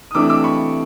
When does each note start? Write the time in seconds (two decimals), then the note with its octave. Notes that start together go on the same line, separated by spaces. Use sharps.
0.11 D#6
0.15 C3 E3 A3 D4 D6 E6
0.29 D6 E6
0.44 B5 C#6